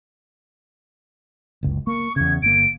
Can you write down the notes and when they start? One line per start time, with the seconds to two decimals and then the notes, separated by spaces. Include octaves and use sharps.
1.63 F#1 C#2
1.87 A#3 C#6
2.16 E2 C#3 G#6
2.42 G1 A#3 D7